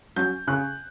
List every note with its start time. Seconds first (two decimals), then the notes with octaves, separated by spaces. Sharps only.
0.16 F#3 C#4 G6
0.47 C#3 F#6